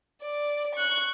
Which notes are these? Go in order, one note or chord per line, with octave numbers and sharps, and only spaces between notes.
D5
C#6 F#6